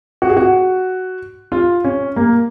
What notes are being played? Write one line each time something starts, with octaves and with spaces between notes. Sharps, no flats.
F#4
G#4
F#4
F4
C#4
A#3